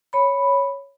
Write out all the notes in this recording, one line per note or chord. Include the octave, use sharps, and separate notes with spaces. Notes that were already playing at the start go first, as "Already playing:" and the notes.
C#5 B5